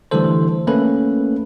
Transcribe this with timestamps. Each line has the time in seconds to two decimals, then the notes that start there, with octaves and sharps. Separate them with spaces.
0.11 D3 E3 G3 A3 A4 C5
0.67 A3 A#3 C#4 A4 B4